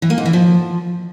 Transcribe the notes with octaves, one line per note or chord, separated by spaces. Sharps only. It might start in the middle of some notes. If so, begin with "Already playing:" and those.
E3
A#3
G#2
E3
F3